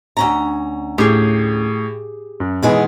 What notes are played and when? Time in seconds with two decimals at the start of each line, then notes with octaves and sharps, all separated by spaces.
0.17 D2 C#4 A#5
0.98 A2 G4 G#4
2.40 F#2
2.63 B2 D#3 E3 G#3 B3